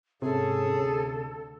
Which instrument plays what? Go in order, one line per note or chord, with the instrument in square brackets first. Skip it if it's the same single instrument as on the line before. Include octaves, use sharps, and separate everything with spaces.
[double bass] G#2 C#4 [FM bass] C3 [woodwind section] G#4 [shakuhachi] A4
[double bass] D2